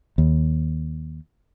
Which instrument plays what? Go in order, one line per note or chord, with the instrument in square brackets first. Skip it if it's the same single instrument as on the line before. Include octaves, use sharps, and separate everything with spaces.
[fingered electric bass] D#2